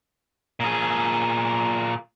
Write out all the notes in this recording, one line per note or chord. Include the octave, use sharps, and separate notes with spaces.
A#2 G#4